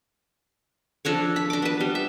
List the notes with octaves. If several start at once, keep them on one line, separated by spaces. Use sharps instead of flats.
F3 D4 A4 C#5
B5
D4 D6
B3 B4
G3
E5